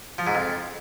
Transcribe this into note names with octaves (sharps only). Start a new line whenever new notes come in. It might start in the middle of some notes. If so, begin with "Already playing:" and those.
F3
G#2
F2